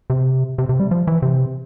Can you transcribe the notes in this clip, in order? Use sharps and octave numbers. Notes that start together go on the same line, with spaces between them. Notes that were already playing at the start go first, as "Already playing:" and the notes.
C3
C3
C3
G3
F3
E3
C3